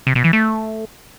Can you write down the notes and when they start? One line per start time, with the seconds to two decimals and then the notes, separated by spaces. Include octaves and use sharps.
0.07 C3
0.15 B2
0.24 E3
0.33 A3